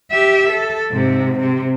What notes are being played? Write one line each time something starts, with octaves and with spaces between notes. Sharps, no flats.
G4 E5
A4
G#2 C3
C3